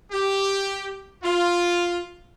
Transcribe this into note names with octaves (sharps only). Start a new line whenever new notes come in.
G4
F4